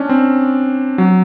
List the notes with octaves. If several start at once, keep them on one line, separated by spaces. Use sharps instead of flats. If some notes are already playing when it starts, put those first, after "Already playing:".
Already playing: C#4 D4
C4
F#3